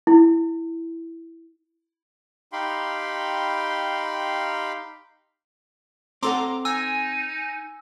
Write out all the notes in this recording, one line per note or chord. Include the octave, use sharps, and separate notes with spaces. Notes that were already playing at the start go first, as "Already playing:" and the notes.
E4
D#4 G4 F5 G5 B5 C6
C4 A4 F#5 A#5 C6 D6
D#4 G#5 E6